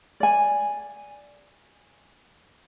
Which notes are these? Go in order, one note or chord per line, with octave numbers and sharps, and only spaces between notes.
D5 G#5